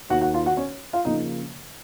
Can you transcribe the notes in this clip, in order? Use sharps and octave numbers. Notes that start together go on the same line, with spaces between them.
D#2 D#3 A#3 F#4 F#5
F#4 F#5
F4 F5
F#4 F#5
C#4 C#5
F4 F5
C#3 F3 A#3 D#4 D#5